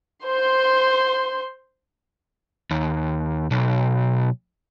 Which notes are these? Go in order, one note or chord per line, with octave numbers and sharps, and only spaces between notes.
C5 C6
D#2
B1